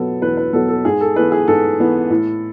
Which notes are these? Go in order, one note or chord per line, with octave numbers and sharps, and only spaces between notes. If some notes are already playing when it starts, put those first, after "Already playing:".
Already playing: B2 F#3 B3 A4
E2 B4
B4
B2 F#3 B3 A4
A4
G#2 G#4
A4
E3 B3 B4
G#4
G#2 A4
E3 B3
A2